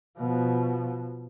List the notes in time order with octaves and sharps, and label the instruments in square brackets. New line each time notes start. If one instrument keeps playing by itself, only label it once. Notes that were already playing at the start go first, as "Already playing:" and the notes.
[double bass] B2 F3